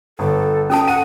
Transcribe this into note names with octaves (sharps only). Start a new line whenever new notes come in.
G1 A4
C#4 A4 G5 A5
F#5 D#7